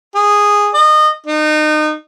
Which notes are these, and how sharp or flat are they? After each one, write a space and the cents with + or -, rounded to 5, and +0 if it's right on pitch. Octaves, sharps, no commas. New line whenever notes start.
G#4 -10
D#5 -25
D#4 -30